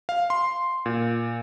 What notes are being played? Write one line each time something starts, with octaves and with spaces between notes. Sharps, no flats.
F5
C6
A#2